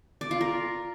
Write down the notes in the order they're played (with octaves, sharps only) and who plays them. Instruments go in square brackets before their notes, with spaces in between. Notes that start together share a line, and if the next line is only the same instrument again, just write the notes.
[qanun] D5
F4
A#4